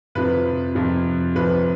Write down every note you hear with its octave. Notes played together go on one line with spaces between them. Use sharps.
F2 C3 F3 B4
F2 C3 F3
F2 C3 F3 B4